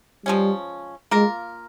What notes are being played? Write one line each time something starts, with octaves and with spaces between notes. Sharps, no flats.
F3 G3 G#3 C#4
G#3 A#3 F4 A#4